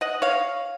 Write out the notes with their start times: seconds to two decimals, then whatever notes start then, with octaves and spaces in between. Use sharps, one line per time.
0.01 D#5 F#5
0.22 C#5 F5